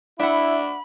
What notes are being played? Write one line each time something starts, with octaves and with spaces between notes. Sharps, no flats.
D4 E4 E5 F#5 B5